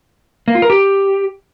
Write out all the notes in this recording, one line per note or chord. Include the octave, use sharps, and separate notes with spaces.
A#3
F4
A#4
G4